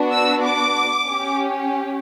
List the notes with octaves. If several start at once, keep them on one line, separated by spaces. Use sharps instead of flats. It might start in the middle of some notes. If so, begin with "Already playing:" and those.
Already playing: B3 D4 F#4
E6
D6
C#4 G4